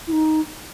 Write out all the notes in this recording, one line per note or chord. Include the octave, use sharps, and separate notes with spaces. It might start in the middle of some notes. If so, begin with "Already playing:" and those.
E4
D#4